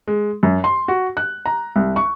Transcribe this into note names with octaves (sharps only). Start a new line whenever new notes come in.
G#3
F#2
C6
F#4
F#6
A#5
C2
C#6